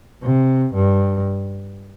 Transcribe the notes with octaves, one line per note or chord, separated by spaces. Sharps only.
C3
G2